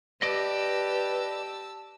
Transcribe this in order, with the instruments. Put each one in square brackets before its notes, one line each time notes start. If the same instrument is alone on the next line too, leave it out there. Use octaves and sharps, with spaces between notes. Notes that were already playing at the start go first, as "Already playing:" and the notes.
[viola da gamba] G4 [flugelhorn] B4 [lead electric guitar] D5 D#5 [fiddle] A5 E6